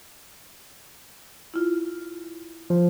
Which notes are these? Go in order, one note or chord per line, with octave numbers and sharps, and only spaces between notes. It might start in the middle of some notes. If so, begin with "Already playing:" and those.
E4 F4
F3